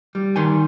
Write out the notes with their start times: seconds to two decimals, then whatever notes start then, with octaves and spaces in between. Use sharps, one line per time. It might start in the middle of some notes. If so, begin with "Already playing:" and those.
0.15 G3
0.36 D#3 G#5 C6